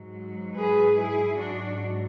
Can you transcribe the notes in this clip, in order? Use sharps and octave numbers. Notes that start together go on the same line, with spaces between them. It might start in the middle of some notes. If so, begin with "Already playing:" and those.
Already playing: G#2 F#3
G#4 B4
E4 G#4
G#2 F#3 D4 F#4